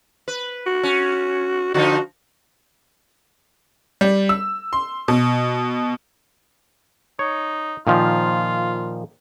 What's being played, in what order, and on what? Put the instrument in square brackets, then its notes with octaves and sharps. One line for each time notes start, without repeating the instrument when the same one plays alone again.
[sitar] B4
[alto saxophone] F#4
[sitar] C#4
[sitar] D3 F3 D#4 [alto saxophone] F#4
[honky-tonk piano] G3
E6
C6
B2
[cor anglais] D#4 [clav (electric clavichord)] C#5
[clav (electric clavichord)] A#2 D#3 F3 [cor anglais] F4